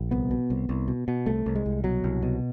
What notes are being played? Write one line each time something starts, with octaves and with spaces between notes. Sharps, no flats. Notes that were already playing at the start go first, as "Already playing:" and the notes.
Already playing: A#1
C2 B3
B2
C2
C2
B2
B2
C2 A3
C2
G#3
C2
B2 F#3
C2
B2